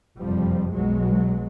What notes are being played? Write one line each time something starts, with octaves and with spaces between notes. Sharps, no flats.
F#1 F2 C3 F3 G3
B1 B2 F#3 G#3